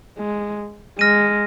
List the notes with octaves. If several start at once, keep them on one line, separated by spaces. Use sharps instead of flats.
G#3
G#3 F6 A#6 D#7